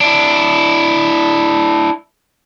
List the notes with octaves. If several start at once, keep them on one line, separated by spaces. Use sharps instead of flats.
D4 E4